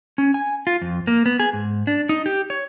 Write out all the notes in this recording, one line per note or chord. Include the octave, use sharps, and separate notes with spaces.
C#4
G#5
F4
F2
A#3
B3
G#4
G#2
D4
D#4
G4
C#5